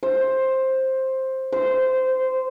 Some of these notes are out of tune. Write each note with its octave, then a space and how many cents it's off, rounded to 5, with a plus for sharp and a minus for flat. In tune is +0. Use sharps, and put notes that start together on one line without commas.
C5 +10
C5 -15